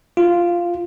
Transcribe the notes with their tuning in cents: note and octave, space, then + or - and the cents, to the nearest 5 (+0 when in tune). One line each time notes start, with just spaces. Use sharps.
F4 -5